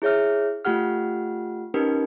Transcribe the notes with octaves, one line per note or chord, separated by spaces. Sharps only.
E4 G#4 C#5 E5 F6
A3 F4 G4 F#5 F6
C#4 D#4 G4 A#4 B4